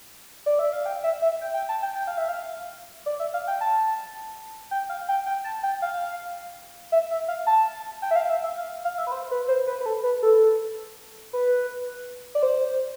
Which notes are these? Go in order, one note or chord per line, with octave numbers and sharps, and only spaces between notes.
D5
E5
F5
G5
E5
E5
G5
G5
A5
G5
G5
F5
E5
F5
D5
E5
F5
G5
A5
G5
F5
G5
G5
A5
G5
F5
E5
E5
F5
A5
G5
E5
F5
E5
E5
F5
F5
E5
B4
C5
B4
C5
B4
B4
A4
B4
A4
B4
D5
C5